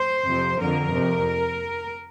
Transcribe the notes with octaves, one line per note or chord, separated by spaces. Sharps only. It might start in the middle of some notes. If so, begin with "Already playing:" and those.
Already playing: C5
F2 C3 F3
F2 D3 F3 A#4
F2 C3